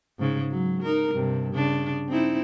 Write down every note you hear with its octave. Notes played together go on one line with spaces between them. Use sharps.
G#2 C#3 G#3
F#3
D#4 A#4
G2 C3
C#3 D4
C4 D#4 E4